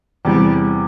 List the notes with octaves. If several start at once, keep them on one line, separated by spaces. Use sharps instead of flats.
E2 C3 E3 G3